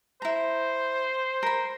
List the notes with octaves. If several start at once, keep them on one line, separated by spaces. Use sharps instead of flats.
E4 C5 A#5
A#4 B5